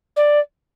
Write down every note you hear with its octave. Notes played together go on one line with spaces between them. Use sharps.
D5